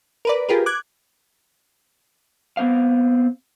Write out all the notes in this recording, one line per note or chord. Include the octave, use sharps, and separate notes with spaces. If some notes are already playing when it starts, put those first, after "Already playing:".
A#4 B4 D5
F4 G4 G#4 A#4 B4
D6 F#6 G#6
B3 C4 F5